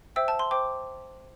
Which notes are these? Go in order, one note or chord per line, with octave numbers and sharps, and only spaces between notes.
C5 E5 G5 E6
A5
C6
C5 G5 D6